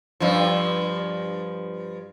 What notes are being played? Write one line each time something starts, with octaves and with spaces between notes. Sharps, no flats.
G2 F3